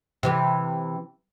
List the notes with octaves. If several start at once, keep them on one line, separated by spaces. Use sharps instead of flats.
C3 E3 G4